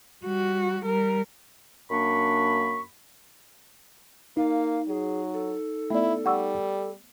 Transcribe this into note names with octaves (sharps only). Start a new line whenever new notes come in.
G3 F#4
G3 A#4
F#2 A#3 D4 B5 C#6
A#3 D#4 F5
F#3 G#4
A4
A3 B3 E4 D5
G3 F#5 C#6 E6